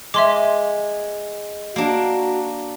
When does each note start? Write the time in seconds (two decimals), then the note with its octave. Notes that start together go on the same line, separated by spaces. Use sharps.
0.14 G#3 E5 C6 D6
1.76 A#3 D4 F#4